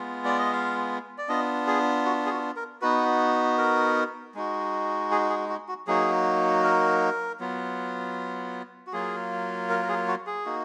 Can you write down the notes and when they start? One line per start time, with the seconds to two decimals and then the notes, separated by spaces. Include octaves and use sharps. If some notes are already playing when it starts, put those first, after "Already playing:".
Already playing: G#3 B3 F4
0.25 D5
0.39 D#5
0.53 F5
1.18 D5
1.29 B3 D4 F4 D#5
1.67 G#4
2.06 F#4
2.26 G#4
2.30 F#4
2.56 A#4
2.82 B3 D#4 F#4 B4
3.58 A#4
4.35 G#3 D#4 F#4
5.11 G#4
5.30 G#4
5.49 F#4
5.68 F#4
5.87 F#3 A#3 D#4 F#4 G#4
6.64 A#4
7.40 F#3 B3 F4
8.87 F#4
8.93 F#3 A#3 F4 G#4
9.69 A#4
9.82 A#4
9.89 G#4
10.08 F#4
10.27 G#4
10.45 A#3 D#4 F#4